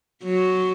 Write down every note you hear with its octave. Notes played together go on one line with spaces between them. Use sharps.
F#3